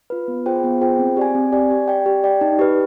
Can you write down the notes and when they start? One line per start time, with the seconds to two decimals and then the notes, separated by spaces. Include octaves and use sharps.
0.10 F4 B4
0.28 B3
0.46 F4 G#4 C5 G5
0.64 B3
0.81 F4 G#4 C5 G5
0.99 C4
1.17 G4 D5 G#5
1.35 C4
1.52 G4 D5 G#5
1.71 G4
1.88 D5 G5
2.06 G4
2.24 D5 G5
2.41 D#4
2.59 G4 B4